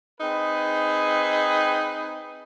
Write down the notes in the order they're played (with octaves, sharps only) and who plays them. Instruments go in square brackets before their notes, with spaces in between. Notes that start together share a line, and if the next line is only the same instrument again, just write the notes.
[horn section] C4 D#4 G#4 B4